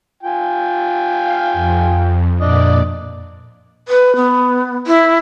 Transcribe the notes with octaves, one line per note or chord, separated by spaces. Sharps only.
F4 G5 G#5
F5
F2
F2 A#2 D4 D5 D#5
B4
B3
E4